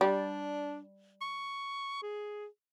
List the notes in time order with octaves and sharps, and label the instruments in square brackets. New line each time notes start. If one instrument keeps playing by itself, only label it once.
[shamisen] G3 [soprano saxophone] D4
[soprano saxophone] C#6
G#4